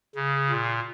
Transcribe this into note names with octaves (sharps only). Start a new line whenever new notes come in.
C#3
A#2